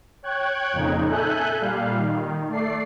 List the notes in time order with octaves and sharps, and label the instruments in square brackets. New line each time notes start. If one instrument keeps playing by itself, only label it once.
[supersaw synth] C#5 G5 F#6 G#6
F2 A#2 C#3 D#4
A4 E5 G#5 F#6 G6
A#2 G3 F5
D#3
A3 D5 C7